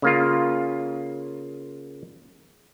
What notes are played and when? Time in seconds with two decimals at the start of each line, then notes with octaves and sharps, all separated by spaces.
0.02 C#3 A#3 F4